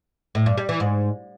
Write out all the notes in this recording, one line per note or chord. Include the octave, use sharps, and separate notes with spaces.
A2
G2
G3
E3
G#2